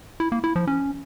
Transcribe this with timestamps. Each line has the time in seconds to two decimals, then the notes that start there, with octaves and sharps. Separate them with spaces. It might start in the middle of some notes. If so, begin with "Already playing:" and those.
0.20 E4
0.32 A#3
0.44 E4
0.56 F3
0.67 C#4